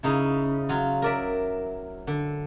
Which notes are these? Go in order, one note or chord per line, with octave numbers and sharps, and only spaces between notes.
C#3 D#4 E4
F#3 F4
A#4 D5 E5
D3